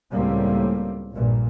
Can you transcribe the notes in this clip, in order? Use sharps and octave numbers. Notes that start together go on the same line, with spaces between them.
C#2 A2 G3 A#3 C4
A#1 G2 A#2